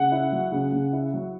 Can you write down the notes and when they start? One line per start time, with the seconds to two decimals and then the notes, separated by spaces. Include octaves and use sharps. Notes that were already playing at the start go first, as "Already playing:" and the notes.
Already playing: C#3 F#5
0.12 E4
0.32 F#3
0.52 C#3
0.72 C#3
0.93 E4
1.14 F#3